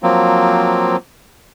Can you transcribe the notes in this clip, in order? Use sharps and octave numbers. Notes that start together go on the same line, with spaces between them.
F3 F#3 A#3 C4